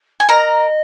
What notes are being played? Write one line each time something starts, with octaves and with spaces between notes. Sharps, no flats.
G#5
A#4 D#5 A#5